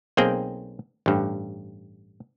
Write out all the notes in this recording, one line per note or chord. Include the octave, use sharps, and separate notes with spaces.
B1 A#3 C4 G#4 G5
A1 G2